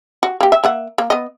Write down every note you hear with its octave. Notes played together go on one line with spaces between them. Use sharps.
F#4
A#3 G4
E5
A#3 E5 F#5
A#3
B3 D#5